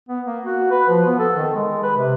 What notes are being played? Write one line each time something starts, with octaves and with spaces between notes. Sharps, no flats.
B3
A#3
F#4
B4
F3
B3
A4
D#3
G#3
B4
C3